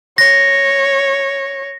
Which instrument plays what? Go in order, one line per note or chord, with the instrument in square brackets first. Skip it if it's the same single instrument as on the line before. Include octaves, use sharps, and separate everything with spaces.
[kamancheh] C#5 [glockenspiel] A#6